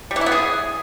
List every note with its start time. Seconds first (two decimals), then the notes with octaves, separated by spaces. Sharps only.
0.11 G3
0.16 E3
0.21 E4
0.26 B3
0.32 G#4